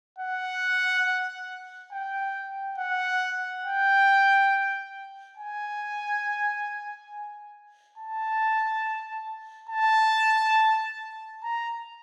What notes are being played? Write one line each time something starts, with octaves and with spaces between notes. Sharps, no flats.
F#5
G5
F#5
G5
G#5
A5
A5
A#5